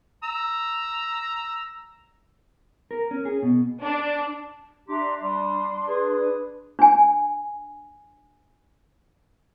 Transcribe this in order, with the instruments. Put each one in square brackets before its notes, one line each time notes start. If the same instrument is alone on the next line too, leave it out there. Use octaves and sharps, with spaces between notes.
[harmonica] A#5 E6
[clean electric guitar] A#4
C#4
G#4
B2
[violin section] D4
[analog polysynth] D4 [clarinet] G4 [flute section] E5 A#5 C6
[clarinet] G3 [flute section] C6
[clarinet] G#4 [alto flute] B4
[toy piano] D4 G#5